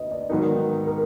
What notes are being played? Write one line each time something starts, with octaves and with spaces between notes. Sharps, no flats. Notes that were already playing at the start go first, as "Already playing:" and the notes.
Already playing: D2 D3 B4 D#5
D5
G#2 D#3 F#3 B3 D#4 A#4
A#4